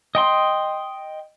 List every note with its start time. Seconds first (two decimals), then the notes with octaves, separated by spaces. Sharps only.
0.15 D#5 G5 C6